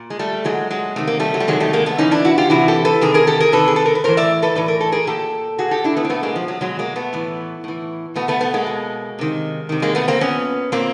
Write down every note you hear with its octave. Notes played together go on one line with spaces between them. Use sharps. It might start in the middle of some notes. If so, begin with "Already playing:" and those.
Already playing: A#2
G#3
G3 A3
A#2 F#3 G#3
F#3 G#3
C3 D#3 A3
A#3
G3 A3
F#3
G3
C3 D#3 F#3 G#3
G3 A3
G#3 A#3
A3 B3
C3 E3 C#4 D#4
D4 E4
E4 F#4
F4 G4
C3 E3 E4 F#4
G4 A4
A4 B4
C3 D#3 G#4 A#4
G#4 A#4
G4 A4
G#4 A#4
C3 D#3 A4 B4
G#4
A4
A#4
B4
A2 E3 A#4 C5
D5 E5
A4 B4
A2 E3 B4
A#4
A4
G#4 A#4
A#2 G4 A4
A#2 F#4 G#4
G4 A4
D4 E4
A3 B3
C4
B2 A3 B3
G#3 A#3
F3
F#3
B2 F#3 G#3
G#3 A#3
A3 B3
A2 E3
A2 E3
B2 A3 B3
A3 B3
A3 B3
G#3 A#3
B2
C3 D#3
C3 D#3
G#3 A#3
A3 B3
A#3 C4
A#2 B3 C#4
A#2 A#3 C4